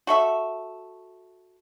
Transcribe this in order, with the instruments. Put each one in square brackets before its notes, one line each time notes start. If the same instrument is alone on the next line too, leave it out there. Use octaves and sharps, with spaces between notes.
[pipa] F#4 A4 E5